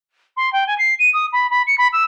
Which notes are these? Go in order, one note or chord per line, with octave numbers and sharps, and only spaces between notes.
C6
G5
G#5
C7
D#7
D#6
B5
B5
C#7
B5
E6